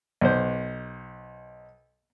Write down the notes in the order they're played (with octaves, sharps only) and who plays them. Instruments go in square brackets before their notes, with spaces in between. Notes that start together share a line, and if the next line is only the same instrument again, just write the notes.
[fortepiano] B1 C5